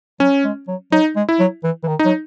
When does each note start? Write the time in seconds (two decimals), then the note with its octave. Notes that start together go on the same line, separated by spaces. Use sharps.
0.20 F#3 C#4
0.44 G#3
0.68 F#3
0.92 F#3 D#4
1.16 G#3
1.29 E4
1.40 F#3
1.64 E3
1.83 E3
1.88 D#3
1.99 D#4
2.05 F#3